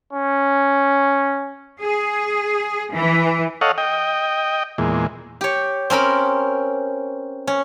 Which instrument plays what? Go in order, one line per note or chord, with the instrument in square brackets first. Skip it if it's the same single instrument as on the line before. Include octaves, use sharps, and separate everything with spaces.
[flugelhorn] C#4
[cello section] G#4
E3
[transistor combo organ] A4 C#5 D#5 F5 F#5
D#5 G5
E2 A#2 G#3
[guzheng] G4 C#5
C4 C#4 A#4 B5
C#4